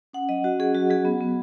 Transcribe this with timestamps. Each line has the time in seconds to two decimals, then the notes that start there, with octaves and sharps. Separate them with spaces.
0.13 C#4 F#5
0.29 F#3 D#5
0.44 F#4
0.59 C#4 G#4
0.75 F#3 F#4
0.90 F#3 G#4
1.05 B3
1.21 B3